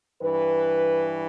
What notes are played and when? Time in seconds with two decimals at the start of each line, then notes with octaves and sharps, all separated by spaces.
0.21 G2 E3 B4